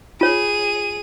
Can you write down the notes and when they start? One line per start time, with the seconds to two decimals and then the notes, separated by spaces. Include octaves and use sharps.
0.21 F4 G#4 C#5 D#7